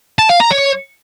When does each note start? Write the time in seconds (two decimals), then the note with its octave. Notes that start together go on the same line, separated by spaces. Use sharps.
0.19 A5
0.29 F5
0.40 A#5
0.51 C#5